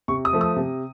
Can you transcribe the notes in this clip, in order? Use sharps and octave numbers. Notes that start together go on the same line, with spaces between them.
C3 C#6
D#6
F3 A3
D#6
C3